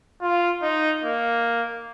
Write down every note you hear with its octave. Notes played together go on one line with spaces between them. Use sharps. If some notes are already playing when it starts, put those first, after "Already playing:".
F4
D#4
A#3